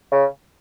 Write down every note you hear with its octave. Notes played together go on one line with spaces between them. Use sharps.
C#3